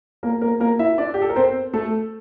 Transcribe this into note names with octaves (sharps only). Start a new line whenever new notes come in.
A#3 A#4
A#3 A#4
A#3 A#4
E4 E5
D4 D5
G4
A4
A#4
C4 C5
A3 A4